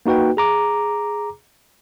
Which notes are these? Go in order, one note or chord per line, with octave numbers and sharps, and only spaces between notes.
A#3 D#4 F#4 B4 G5
G#4 A#5 D6